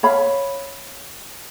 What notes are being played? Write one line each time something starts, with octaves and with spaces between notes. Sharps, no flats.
C#5 F5 B5